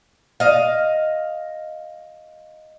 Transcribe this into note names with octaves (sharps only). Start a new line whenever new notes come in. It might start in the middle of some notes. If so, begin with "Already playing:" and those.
D#5 F5